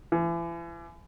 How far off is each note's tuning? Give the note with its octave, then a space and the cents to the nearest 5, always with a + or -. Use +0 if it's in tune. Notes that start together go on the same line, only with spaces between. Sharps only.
E3 +40